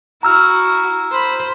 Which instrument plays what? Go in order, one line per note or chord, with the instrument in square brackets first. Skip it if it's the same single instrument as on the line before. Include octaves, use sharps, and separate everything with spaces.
[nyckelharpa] E4 F#4 [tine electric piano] A#5 E6 F6
[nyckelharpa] C5 B5